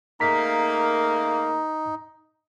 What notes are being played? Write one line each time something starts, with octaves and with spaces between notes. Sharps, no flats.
C#3 A3 A#3 D#4 A#5 B6